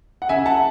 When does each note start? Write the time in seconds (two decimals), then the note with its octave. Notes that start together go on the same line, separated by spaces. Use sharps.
0.22 F#5
0.29 C#3 E5 G#5
0.46 F#5 A5